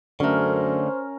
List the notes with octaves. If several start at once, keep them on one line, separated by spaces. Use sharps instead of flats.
F#2 D3 A3 C#4 A#4 C5